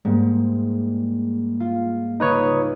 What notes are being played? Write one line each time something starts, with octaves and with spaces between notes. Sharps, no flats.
G#2 G3 G#3 A#3
F4
C#2 D#4 B4 C#5 D#6